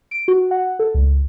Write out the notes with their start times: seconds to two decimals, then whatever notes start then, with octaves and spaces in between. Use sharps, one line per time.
0.11 D7
0.28 F#4
0.51 F#5
0.79 A4
0.94 C#2